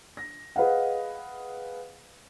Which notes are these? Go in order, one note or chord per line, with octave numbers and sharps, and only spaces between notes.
A#6
G#4 B4 D#5 F5 F#5